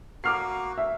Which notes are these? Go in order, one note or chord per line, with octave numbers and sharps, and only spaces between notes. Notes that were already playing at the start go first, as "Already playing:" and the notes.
A#3 F#4 D6 F6 C7
E5